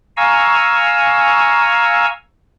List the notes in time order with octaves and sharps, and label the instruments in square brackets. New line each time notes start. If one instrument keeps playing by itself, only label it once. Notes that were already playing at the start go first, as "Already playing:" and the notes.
[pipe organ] F5 G#5 A#5 C#6 E6